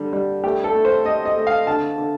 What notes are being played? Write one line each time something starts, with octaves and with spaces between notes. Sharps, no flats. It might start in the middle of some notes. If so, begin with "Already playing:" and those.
Already playing: D3 G3
G3
A3 G4
A4
A3
C5
A3 D#5
D#5
A3
F5
D3 A5
D3